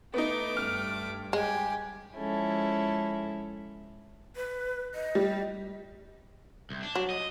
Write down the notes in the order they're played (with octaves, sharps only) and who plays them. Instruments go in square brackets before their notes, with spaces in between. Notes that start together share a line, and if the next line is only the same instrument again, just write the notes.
[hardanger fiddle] A3 D6 [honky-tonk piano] B3 D#4
[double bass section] G2 [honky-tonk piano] F6
[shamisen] G#3 [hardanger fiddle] G4 G#5
[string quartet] F3 G#3 C#4 E4 A4
[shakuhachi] B4
D#5
[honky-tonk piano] G3
[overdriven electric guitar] C2
D4
[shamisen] F#3
[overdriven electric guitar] D#5